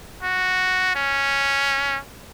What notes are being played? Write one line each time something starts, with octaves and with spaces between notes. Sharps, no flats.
F#4
C#4